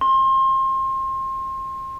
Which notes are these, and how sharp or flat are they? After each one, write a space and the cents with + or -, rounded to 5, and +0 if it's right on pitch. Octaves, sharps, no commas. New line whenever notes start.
C6 +30